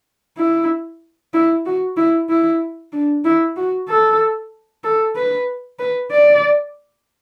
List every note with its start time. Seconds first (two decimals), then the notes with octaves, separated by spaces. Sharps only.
0.37 E4
1.34 E4
1.66 F#4
1.97 E4
2.29 E4
2.92 D4
3.25 E4
3.56 F#4
3.88 A4
4.84 A4
5.16 B4
5.79 B4
6.11 D5